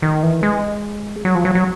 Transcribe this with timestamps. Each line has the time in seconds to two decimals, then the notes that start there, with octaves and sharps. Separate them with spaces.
0.02 D#3
0.23 E3
0.43 G#3
1.25 F#3
1.35 F3
1.45 F#3
1.55 F#3